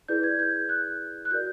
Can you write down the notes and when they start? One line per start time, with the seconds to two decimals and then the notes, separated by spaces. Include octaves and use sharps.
0.08 E4 G#4 B4 D5 G6
0.23 G#6
0.39 G6
0.69 F#6
1.25 F#6
1.31 F#4 A#4 D5 G6